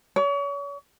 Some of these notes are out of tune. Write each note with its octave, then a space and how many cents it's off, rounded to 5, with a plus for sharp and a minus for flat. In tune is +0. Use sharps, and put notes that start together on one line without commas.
C#5 +35